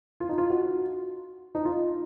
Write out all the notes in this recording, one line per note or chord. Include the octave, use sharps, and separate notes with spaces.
F4
D#4
F4
F#4
D#4
F4